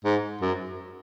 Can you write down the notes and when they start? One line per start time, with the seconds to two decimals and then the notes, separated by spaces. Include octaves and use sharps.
0.05 G#2
0.41 F#2